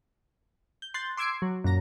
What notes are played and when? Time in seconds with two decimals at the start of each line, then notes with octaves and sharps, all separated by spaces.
0.82 G6
0.94 C6 F#6 G6 A6
1.17 C6 D6 E6 G#6 C7 D7
1.42 F#3
1.64 F#2 A#2 A#5 A#6